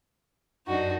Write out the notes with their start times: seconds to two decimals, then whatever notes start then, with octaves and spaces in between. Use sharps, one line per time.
0.67 F#2 D4 D#4 F#4